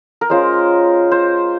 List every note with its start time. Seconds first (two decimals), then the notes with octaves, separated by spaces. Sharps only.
0.21 A#4
0.30 G#3 C#4 F4 C5
1.12 C5